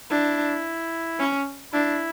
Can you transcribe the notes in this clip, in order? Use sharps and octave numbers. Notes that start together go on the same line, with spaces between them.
D4 E4
C#4
D4 E4